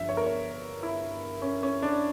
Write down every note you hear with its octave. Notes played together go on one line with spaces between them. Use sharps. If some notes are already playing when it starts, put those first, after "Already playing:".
Already playing: G1 G2 F3 E5
C#5
A#4
C#5
E4
C#4
C#4
D4